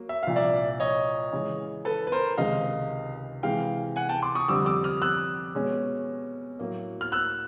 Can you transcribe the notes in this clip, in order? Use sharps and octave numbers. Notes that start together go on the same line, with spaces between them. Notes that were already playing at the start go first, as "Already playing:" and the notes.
Already playing: F#3 A#3
E5
C2 A#2 F3 F5
D5 E5
C#5 D#5
C#3 E3 G#3
A4 B4
B4
A#4 C5
C#2 C3 D#3 G#3 D#5 F5
C3 E3 G#3 F5 G5
F#5 G#5
G5 A5
C6 D6
C#6 D#6
F2 D3 G3 C4 D6 E6
D6 E6
D#6 F6
E6 F#6
B2 G#3 C#4
A2 F#3 A#3
F6
E6 F#6